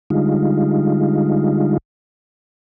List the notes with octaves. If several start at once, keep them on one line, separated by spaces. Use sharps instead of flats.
D3 G3 G#3 D#4 F4